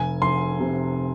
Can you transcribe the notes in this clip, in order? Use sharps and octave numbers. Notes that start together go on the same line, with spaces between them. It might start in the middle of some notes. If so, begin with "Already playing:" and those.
Already playing: F1 G#5
F1 C6
C3